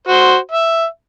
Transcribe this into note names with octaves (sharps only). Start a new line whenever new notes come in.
F#4 C5
E5